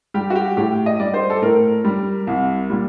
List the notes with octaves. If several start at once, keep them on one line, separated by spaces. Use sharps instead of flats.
G3 G4
F#4
G4
A2 G4
D#5
G3 D5
C5
A4
A2 A#4
G3
C2
A#2 G3